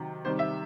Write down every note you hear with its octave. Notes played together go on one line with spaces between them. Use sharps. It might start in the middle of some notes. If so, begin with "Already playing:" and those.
Already playing: C3 D#3 F#3
C3 D#3 G3 C5
E5